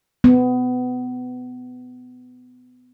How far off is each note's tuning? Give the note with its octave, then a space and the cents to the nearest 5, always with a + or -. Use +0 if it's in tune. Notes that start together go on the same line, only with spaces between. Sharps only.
B3 +25